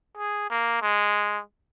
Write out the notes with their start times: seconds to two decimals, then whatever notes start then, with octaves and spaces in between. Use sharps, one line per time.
0.17 G#4
0.50 A#3
0.82 G#3